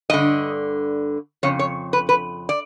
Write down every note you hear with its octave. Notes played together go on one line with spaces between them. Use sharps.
G2 D3 D#5
F2 C#3 C#5
C#5
B4
B4
D5